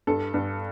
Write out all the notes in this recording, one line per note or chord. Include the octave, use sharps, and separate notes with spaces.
G2 A4
G2